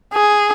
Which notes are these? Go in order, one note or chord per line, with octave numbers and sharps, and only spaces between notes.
G#4